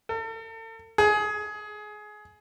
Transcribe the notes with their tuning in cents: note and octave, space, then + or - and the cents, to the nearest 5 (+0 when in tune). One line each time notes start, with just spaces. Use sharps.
A4 +40
G#4 +20